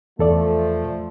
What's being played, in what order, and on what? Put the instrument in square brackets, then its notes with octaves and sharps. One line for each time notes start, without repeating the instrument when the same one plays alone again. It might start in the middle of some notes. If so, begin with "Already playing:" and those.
[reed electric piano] E2 A4 D5 [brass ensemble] F3 A3